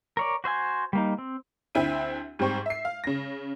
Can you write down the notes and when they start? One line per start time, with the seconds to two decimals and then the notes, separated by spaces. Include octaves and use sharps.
0.17 A#4 C#5 D5
0.44 F#4 C5 E5 G#5
0.93 G3 A#3 D#4
1.18 C4
1.75 D2 C4 E4 E5 D#7
2.39 G#2 G3 C4 C#6
2.66 E5 C7
2.85 F5
3.04 C#3 A#6